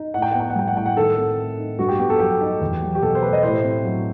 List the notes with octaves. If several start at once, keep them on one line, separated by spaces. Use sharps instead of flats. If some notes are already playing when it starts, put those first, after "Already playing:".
Already playing: D#4
A2 F#5
G5
B3 F#5
G5
F#5
G3 G5
F#5
A2 G5
F#5
D#3 A4
C4
A3
D#4
G2 F#4
G4
B3 G4
A4
F#3 G4
D#4
E2
F#3
G4
B2 A4
C5
A3 B4
D#5
A2 C5
C4
F#3